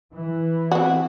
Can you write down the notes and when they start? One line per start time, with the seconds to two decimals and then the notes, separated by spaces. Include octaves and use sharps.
0.15 E3
0.71 C4 F#4